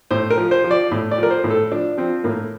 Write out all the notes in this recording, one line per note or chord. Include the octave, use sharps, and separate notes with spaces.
A2 C5
A#4
F3
C5
F3
D5
A2
D5
F3
A#4
C5
A2
A4
F3 D4
F3 C4
A2 A#3